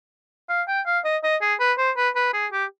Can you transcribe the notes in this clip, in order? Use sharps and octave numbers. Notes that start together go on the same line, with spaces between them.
F5
G5
F5
D#5
D#5
G#4
B4
C5
B4
B4
G#4
G4